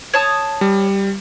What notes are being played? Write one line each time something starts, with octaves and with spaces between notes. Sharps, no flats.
C#5 A5 D#6
G3